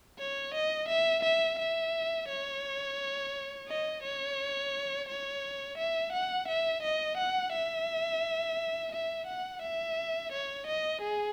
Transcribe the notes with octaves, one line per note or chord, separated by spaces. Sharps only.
C#5
D#5
E5
E5
E5
C#5
D#5
C#5
C#5
E5
F#5
E5
D#5
F#5
E5
E5
F#5
E5
C#5
D#5
G#4